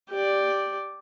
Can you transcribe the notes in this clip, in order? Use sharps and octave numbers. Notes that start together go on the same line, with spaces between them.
G4 D5